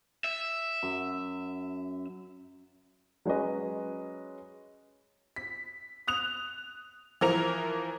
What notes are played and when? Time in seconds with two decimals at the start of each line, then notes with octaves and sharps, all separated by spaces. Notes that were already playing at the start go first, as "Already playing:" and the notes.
0.24 E5
0.83 F#2
3.25 F#3 G#3 C#4 B4 D#5
5.36 B6
6.07 D#6 F#6 F7
7.21 E3 F3 A#4 F7